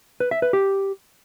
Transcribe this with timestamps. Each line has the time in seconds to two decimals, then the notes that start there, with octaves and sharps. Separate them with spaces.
0.20 B4
0.31 E5
0.42 B4
0.53 G4